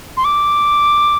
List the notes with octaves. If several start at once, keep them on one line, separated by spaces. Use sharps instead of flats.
C6
D6